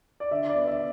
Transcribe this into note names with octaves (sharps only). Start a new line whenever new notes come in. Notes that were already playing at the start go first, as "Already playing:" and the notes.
D5
D3 E5
D5
B3
E5